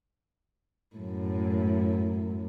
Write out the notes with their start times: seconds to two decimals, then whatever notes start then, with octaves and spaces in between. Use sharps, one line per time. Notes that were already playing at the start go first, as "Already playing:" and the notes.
0.96 F#2 A2